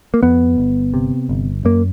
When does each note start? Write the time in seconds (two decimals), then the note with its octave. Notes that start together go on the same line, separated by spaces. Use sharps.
0.14 A#3
0.23 F2 B3
0.58 G1
0.94 C3
1.29 G1
1.65 F#2 A#3